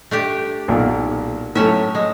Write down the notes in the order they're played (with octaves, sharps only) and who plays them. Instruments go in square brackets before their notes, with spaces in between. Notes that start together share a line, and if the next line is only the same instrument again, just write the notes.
[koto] A3 D4 G4
[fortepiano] B1 A#2
[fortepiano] A2 A3 [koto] F#3 C#4 E5
[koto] G#3